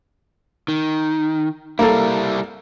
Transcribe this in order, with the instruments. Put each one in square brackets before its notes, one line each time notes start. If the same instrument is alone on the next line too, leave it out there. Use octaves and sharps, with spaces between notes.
[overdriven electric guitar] D#3
[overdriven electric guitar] G3 E4 [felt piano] A#3 A4